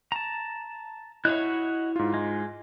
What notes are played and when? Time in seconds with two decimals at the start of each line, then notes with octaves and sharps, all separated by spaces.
0.12 A5 A#5
1.25 E4 F#4 C#5 D#5 E5 F#6
1.96 G#2 F4
2.14 G#3